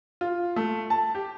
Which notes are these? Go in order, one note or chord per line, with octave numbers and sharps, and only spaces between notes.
F4
A3
A5
G4